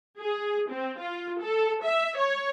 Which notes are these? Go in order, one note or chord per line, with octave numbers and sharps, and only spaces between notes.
G#4
C4
F4
A4
E5
C#5